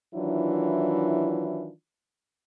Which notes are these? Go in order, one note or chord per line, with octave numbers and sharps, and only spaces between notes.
D#3 E3 F#3 D4 E4 F4